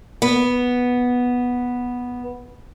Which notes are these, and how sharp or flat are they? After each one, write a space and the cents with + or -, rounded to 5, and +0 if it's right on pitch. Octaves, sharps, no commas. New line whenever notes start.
B3 -5